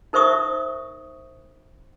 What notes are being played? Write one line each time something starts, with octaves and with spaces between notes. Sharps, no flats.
D#4 A#4 C5 E5 C#6 D#6